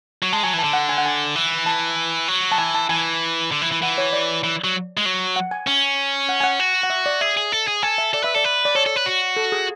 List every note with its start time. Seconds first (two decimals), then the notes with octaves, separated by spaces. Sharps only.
0.23 F#3
0.33 G#3 A5
0.43 F#3 G#5
0.53 E3
0.59 A5
0.64 D3
0.73 F#5
0.89 G#5
0.98 F#5
1.06 G#5
1.36 E3
1.66 A5
2.28 F#3
2.52 A5
2.58 E3 G#5
2.75 A5
2.89 E3 G#5
3.52 D3
3.62 E3
3.72 E3
3.82 E3 F#5
3.98 C#5
4.13 D5
4.44 E3
4.64 F#3
4.97 G#3
5.05 F#3
5.36 F#5
5.51 G#5
5.67 C#4 G#5
6.29 F#5
6.40 G#5
6.44 F#5
6.60 F#4
6.83 F#5
6.90 E5
7.06 D5
7.21 G#4 E5
7.37 G#4
7.52 A4
7.68 G#4
7.83 A4 G#5
7.98 E5
8.13 A4 D5
8.24 B4 E5
8.35 A4 D5
8.44 B4
8.65 D5
8.75 A4 C#5
8.86 A4
8.96 B4
9.06 F#4
9.37 A4
9.52 G#4